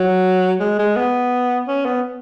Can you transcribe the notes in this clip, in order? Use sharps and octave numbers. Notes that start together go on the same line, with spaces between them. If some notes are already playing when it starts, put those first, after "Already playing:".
Already playing: F#3
G#3
G#3
B3
C#4
B3